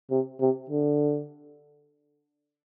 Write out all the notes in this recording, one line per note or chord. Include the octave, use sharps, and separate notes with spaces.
C3
C3
D3